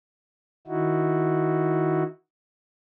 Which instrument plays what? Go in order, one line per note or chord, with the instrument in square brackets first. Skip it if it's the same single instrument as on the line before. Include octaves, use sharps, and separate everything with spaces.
[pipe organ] D#3 D#4 E4 F#4